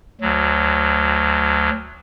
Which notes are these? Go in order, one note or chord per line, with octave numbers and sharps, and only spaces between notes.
D2 F#3